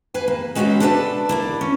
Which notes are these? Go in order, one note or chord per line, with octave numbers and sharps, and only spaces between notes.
B4 F5 G#5
A#3
G#3 C#4 F#4 B4 C5 E5
D4 A4 B4 C5 D5 E5
A#3 E4 D5
C#4